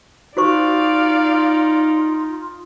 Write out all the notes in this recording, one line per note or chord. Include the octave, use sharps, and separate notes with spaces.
D#4 F4 F#4 C5 D5 F5 C#6